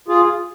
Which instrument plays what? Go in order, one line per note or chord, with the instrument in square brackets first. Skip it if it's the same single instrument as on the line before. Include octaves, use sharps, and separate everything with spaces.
[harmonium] F4 G#4